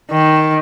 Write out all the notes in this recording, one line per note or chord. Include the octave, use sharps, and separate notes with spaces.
D#3